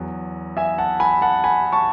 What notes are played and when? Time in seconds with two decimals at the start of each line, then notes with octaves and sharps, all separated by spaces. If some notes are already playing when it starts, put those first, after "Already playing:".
Already playing: E2 F#3
0.57 E5 G#5
0.78 F#5 A5
1.00 G#5 B5
1.22 F#5 A5
1.44 G#5 B5
1.72 A5 C#6